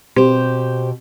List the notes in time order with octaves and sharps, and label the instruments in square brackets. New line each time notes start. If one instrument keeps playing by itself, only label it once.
[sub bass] B2 [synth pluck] C4 [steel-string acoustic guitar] G4 C5